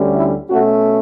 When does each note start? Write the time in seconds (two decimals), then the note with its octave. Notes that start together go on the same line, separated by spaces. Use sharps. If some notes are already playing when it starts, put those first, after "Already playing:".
Already playing: D2 D3 G3 C#4
0.13 E4
0.49 B2 A3 C#4 F#4